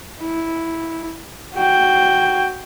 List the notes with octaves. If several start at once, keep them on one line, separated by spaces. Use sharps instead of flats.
E4
F#4 G5